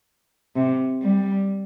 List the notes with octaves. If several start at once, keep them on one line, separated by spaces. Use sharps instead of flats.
C3
G3